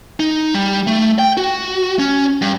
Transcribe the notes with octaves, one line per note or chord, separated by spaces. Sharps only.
D#4
G3
A3
G5
F#4
C#4
G2